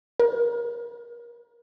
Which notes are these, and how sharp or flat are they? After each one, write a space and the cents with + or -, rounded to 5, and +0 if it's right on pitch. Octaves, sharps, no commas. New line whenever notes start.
A#4 +30